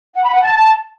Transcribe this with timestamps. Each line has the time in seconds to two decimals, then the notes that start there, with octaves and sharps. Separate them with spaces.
0.15 F#5
0.24 B5
0.33 F#5
0.41 A5